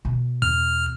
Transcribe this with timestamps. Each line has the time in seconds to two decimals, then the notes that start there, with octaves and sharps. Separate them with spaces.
0.05 B2
0.42 E2 F6